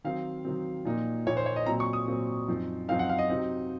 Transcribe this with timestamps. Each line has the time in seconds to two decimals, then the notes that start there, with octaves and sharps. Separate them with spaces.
0.04 D#3 F#3 C4 F5
0.45 D#3 F#3 C4
0.85 A#2 F3 A#3 D#4
1.27 A#2 F3 A#3 D#4 C#5
1.37 C5
1.46 C#5
1.56 D#5
1.66 A#2 F#3 C4 A#5
1.80 C#6
1.93 D#6
2.08 A#2 F#3 C4
2.48 F#2 F3 C4 D#4
2.88 F#2 F3 C4 D#4 F5
2.99 F#5
3.09 F5
3.19 D#5
3.29 C3 F#3 C4 D#4